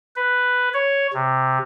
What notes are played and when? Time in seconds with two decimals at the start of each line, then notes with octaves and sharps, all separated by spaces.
0.16 B4
0.74 C#5
1.13 C3